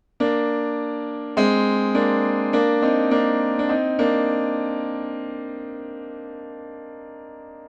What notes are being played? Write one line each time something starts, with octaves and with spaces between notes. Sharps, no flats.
A#3 D4
G#3 C4
A#3 D4
A#3 D4
C4 D#4
A#3 D4
D4
C4 D#4
A#3 D4